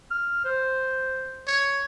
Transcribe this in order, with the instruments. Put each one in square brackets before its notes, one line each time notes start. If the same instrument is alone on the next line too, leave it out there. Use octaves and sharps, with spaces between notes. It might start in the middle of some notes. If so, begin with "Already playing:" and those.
[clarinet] F6
C5
[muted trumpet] C#5